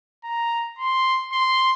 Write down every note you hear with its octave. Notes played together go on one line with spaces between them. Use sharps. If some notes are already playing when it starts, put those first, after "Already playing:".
A#5
C6
C6